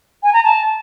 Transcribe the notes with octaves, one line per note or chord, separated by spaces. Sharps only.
G#5
A#5
A5